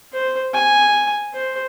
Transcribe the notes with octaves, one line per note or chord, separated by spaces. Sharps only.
C5
G#5
C5